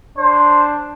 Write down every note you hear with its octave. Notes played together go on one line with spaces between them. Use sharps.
D4 C5